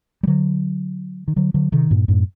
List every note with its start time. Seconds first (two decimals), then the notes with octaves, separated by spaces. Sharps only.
0.23 G3
0.27 D3 F#3
1.28 D#3
1.36 D3 F#3
1.54 D3 F#3
1.72 C3 D#3
1.91 G2 A#2
2.08 F#2 A2